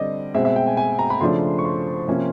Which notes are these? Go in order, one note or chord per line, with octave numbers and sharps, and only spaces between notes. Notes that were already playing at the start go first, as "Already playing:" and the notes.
Already playing: D3 G3 C4 D5 D#5
B2 G#3 C4 E5
E5
G5
G#5
G#5
A#5
B5
C#3 F3 A3 D4 C6
C#6
C6
C3 F3 A#3 C#4